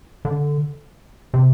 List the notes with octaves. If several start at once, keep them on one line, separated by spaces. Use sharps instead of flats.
D3
C3